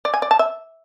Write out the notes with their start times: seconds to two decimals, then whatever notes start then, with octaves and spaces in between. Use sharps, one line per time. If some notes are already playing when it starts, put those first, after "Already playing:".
0.05 D5
0.14 G#5
0.22 D5
0.31 A5
0.39 E5